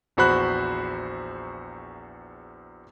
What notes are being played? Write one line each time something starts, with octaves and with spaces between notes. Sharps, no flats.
A#1 E2 F#4 C5 B5 F#6